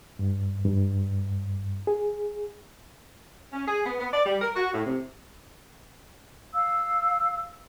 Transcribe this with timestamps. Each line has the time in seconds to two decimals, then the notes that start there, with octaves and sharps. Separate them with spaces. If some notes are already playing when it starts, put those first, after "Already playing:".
0.19 G2
0.65 G2
1.87 G#4
3.53 C#4
3.68 G#4
3.86 B3
4.00 B3
4.14 D5
4.26 G3
4.42 A#4
4.56 F#4
4.74 A2
4.86 C3
6.54 F5 E6